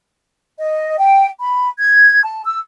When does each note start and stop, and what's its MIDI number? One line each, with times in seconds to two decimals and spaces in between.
0.58 0.96 75
0.98 1.27 79
1.40 1.68 83
1.79 2.21 92
2.23 2.41 81
2.45 2.59 88